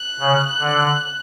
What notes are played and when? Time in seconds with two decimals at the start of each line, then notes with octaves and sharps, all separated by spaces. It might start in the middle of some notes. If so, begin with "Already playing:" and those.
Already playing: F#6
0.20 C#3
0.59 D3